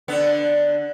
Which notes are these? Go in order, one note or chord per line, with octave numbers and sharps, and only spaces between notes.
D3 B3